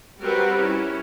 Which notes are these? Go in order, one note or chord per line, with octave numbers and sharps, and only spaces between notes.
G3 C4 F#4 A#4 B4
C#4 E4